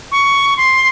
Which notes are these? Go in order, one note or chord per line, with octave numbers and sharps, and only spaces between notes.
C#6
C6